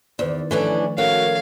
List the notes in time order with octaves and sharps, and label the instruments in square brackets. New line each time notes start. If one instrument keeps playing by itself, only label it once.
[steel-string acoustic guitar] E2 [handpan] D#3 D5 [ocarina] C5
[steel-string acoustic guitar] E3 C#4 D4 [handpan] F3 A3 [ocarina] A4
[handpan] C#4 A4 C#5 [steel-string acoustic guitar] F#4 [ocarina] A#4 [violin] F5